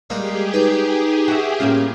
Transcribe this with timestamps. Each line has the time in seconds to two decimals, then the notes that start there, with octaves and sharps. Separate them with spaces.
0.10 G3 G#3 A#3 D#4 F4 G4 G#4
0.53 D#4 B4 D5
1.28 F#4 E5
1.60 A2 A#3 C#4 F4